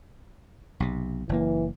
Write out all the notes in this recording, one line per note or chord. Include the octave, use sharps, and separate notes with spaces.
B1 C3
F#1 E3 A#3